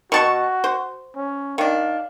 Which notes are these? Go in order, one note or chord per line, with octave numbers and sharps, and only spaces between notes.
B2 F#4 A5 C#6
C5
C#4
D#3 D4 F5